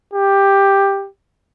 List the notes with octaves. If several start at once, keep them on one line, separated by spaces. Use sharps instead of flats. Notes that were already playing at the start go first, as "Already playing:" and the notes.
G4